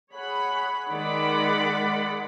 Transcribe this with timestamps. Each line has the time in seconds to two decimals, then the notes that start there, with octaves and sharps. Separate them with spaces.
0.14 G#4 C#5 F#5 B5
0.91 D#3 G#3 D5 F#5 B5